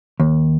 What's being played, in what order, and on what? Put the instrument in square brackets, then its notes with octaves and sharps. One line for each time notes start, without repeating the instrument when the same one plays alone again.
[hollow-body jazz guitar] D#2